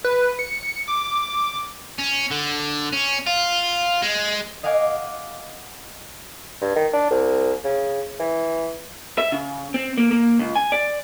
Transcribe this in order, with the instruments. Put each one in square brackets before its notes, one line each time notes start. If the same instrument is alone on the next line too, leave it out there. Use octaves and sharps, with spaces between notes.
[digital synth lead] B4
C#7
D6
[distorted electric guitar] C#4
D3
C#4
F4
G#3
[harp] D#5 F5 F#5 G#5 D6
[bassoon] G2
D#3
D4
C2
C#3
E3
[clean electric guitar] E5
C#3
C4
A#3
A#3
C#2
G#5
D5